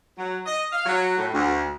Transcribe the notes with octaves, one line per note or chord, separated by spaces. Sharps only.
F#3
D#5
F5
F#3
A2
D2